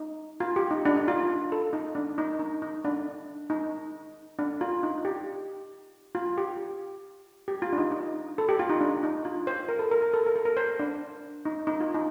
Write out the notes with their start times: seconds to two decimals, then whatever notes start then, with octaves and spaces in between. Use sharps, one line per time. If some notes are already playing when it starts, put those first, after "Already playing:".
Already playing: D#4
0.40 F4
0.56 G4
0.71 D#4
0.85 D4
0.96 D#4
1.08 F4
1.18 F4
1.52 A4
1.73 D#4
1.95 D4
2.18 D#4
2.39 D#4
2.62 D#4
2.85 D4
3.50 D#4
4.39 D4
4.61 F4
4.83 D#4
5.05 G4
6.15 F4
6.38 G4
7.48 G4
7.62 F4
7.73 D4
7.78 D#4
7.91 D#4
8.38 A4
8.49 G4
8.59 F4
8.70 D#4
8.81 D4
9.03 D#4
9.25 F4
9.47 C5
9.68 A#4
9.79 A4
9.91 A#4
10.02 A#4
10.14 A4
10.26 A#4
10.36 A4
10.45 A#4
10.57 C5
10.79 D4
11.45 D#4
11.67 D#4
11.80 F4
11.94 D#4